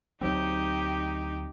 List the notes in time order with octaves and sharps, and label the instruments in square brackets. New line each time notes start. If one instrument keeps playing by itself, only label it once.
[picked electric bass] D2 F#3 C4 [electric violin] D#4 G4